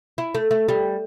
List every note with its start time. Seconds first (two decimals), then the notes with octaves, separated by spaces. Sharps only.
0.18 E4
0.35 A3
0.51 A3
0.69 G3